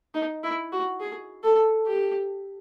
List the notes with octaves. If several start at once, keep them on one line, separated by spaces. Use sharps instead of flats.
D#4
E4
F#4
G#4
A4
G4